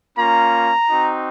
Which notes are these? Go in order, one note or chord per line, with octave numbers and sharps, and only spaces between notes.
A#3 C#4 F4 A#5
C4 D#4 F#4